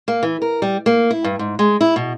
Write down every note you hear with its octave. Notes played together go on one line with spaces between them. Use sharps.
A#3
E3
A#4
G3
A#3
E4
G2
G#2
G#3
E4
B2